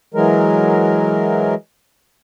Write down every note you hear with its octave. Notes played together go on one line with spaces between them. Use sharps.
E3 F#3 G#3 A#4